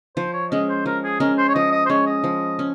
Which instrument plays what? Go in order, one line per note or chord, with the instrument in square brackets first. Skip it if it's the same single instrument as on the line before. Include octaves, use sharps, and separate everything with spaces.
[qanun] F3 [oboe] C5
[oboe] C#5
[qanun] G#3 C#4 [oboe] D#5
[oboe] C5
[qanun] F3 [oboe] A#4
[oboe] G#4
[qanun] G#3 C#4 [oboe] A#4
[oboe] C5
C#5
[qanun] F3 [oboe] D#5
[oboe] D#5
C5
[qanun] G#3 C#4 [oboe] C#5
[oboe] D#5
[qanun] F3
C#4